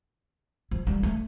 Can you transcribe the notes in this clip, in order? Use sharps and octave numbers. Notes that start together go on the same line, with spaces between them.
F3
G3
A3